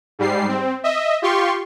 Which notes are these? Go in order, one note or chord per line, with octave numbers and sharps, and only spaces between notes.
G#2 G3 C7
C4
D#5 E5
F4 G4 C6 C#6